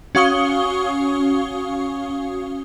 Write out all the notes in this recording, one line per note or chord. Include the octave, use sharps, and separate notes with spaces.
C#4 F#4 F5 C#6 D#6 G7